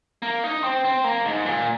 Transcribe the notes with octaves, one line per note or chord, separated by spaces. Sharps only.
A#3
D#4
C4
C4
A#3
G#2
A#2